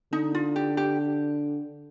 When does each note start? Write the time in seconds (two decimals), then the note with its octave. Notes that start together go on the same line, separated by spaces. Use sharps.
0.13 D3 D#4
0.35 F4
0.56 G4
0.77 G4